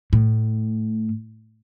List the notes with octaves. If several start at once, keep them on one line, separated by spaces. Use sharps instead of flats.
A2